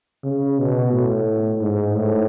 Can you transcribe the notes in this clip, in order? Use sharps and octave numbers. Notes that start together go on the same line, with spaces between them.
C#3
B2
A2
G#2
A2